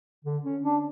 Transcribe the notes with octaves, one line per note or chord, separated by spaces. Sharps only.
D3
C#4
D4